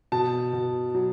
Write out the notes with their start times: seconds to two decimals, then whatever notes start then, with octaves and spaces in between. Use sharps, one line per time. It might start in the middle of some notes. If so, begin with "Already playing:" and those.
0.12 B2 A5
0.53 B2
0.95 F#3